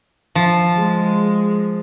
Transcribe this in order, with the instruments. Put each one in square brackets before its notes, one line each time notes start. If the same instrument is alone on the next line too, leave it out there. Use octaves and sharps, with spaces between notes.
[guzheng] F3
[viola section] G#3